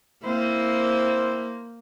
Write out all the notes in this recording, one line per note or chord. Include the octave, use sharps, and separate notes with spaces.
A#3 C4 E4 C5